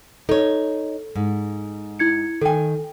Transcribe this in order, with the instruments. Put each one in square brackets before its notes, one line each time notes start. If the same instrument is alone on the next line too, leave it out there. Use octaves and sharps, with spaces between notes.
[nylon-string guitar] D#4 C#5 [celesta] A4
[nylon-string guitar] G#2
[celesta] E4 G#6 C#7
[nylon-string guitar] D#3 G#5 [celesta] A4 G5